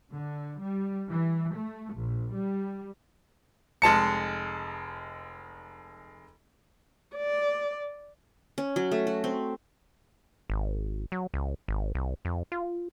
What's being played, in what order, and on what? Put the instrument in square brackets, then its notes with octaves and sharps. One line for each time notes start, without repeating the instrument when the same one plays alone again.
[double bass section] D3
G3
E3
A3
A#1
G3
[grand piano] F1 G#3 A5 C#7
[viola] D5
[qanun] C#4
F#3
A3
F#4
C4
[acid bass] G#1
F#3
C#2
G#1
C2
F2
F4